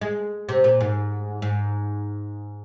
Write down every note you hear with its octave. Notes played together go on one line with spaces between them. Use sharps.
G#3
C3
A#2
G#2
G#2